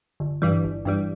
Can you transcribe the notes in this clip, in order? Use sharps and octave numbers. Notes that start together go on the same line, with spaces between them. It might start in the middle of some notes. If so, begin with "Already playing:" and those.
G1
G2 E3 G3
G1
G2 E3 G3